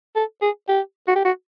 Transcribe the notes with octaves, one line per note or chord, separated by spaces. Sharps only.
A4
G#4
G4
F#4
G4
F#4